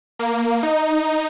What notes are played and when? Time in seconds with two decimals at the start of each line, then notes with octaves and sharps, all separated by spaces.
0.19 A#3
0.63 D#4